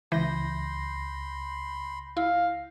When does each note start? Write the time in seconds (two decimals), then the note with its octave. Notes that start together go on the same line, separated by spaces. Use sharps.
0.12 C#2 E3 B5 C6 G6 A#6
2.17 E4 F5